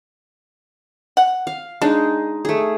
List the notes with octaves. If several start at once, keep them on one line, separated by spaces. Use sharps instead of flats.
F#5
F5
G#3 D4 D#4
A3 G#4